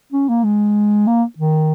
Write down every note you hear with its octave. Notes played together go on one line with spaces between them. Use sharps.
C#4
A#3
G#3
A#3
D#3